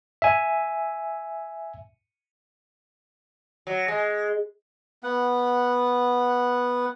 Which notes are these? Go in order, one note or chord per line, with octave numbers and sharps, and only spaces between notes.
E5 G#5
F#3
G#3
B3 F#5